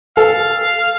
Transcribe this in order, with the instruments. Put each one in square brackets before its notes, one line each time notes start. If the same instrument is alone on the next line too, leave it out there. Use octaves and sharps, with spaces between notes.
[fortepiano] A4 [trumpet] F5